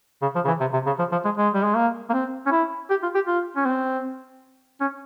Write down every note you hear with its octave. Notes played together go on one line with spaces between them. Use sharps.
C#3
F3
C#3
E3
C3
C3
C#3
F3
F3
G#3
G#3
G3
G#3
A#3
A#3
C4
C#4
E4
G4
F4
G4
F4
C#4
C4
C#4